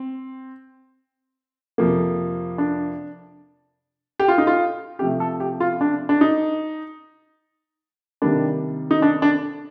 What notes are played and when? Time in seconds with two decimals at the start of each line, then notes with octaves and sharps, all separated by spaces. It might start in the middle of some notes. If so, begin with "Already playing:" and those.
Already playing: C4
1.78 F2 C3 F3 A#3
2.58 D4
4.20 G4
4.28 F4
4.38 D#4
4.47 F4
4.99 C3 F3 A3 G4
5.20 A4
5.40 G4
5.60 F4
5.81 D4
6.09 D4
6.21 D#4
8.22 C3 D#3 G3 A#3 D4
8.91 D#4
9.02 D4
9.22 D4